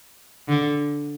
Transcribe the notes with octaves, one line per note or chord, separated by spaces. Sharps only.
D3